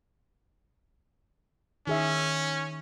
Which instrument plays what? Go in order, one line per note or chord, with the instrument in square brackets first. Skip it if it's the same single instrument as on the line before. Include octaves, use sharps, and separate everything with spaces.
[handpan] D#3 G#4 E5 [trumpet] C#4